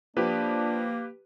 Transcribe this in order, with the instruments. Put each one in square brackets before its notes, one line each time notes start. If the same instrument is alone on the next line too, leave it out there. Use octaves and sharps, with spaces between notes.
[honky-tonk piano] F3 [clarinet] A#3 [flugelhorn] D4 [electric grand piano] G4 B4